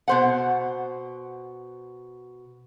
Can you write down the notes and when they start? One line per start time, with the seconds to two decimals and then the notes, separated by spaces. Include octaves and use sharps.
0.08 B2 C5 F#5